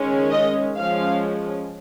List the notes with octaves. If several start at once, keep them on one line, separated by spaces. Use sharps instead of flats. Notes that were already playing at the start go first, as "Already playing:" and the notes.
Already playing: D#3 G#3 C#4
D#5
F3 G#3 C#4 F5